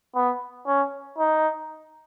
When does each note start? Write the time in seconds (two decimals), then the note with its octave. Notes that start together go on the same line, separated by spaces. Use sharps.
0.15 B3
0.66 C#4
1.18 D#4